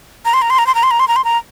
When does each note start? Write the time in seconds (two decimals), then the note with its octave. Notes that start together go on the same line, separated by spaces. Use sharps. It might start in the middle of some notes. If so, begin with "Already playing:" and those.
0.25 A#5
0.34 C6
0.42 A#5
0.50 C6
0.59 A#5
0.67 C6
0.75 A#5
0.83 C6
0.91 A#5
1.00 C6
1.08 A#5
1.16 C6
1.25 A#5